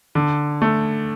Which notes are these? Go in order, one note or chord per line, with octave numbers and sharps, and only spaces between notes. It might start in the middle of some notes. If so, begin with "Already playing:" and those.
D3
A3